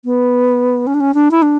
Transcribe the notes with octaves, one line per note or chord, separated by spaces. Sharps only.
B3
C#4
D4
C#4
D4
E4
D4